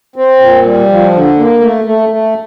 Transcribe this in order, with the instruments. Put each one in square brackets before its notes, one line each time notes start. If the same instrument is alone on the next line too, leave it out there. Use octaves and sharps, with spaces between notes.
[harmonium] C4
A#2
G3
F3
D3
A#3
A3
A3
A3